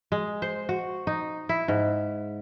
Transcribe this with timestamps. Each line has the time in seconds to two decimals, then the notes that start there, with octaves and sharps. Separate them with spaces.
0.12 G#3
0.42 C5
0.69 F#4
1.07 D#4
1.49 E4
1.68 G#2